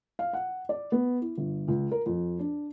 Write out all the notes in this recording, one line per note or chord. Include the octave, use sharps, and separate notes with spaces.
F5
F#5
D5
B3
E4
G1
C#2
A#4
F2
D4